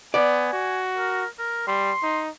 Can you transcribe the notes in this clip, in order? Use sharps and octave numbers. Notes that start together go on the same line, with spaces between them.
B3 D5 G#5
F#4
A#4
A#4
G3 C6
D#4